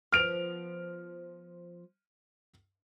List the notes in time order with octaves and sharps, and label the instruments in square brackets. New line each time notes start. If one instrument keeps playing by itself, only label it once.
[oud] F3 B3 [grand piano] F6 D7 F7